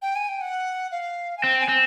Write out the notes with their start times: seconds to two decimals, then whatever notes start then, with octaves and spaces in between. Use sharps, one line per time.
0.02 G5
0.16 G#5
0.29 G5
0.41 F#5
0.92 F5
1.37 G#5
1.43 C4 G5
1.60 G#5
1.69 C4